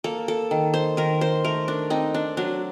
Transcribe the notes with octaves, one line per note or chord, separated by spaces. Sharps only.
A#3 A4
A4
D#3
C5
D#3 A#4
C5
A3 A#4
D4
C4 D#4
D4
F#3 D4